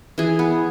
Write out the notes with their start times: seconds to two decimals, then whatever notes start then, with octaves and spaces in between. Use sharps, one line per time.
0.18 E3 G#4
0.39 B3